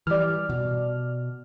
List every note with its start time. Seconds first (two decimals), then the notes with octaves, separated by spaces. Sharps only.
0.07 E3 G3 D5 F6
0.49 B2